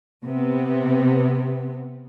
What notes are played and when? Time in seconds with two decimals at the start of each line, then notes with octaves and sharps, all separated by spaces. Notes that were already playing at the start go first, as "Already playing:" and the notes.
0.24 C3 B3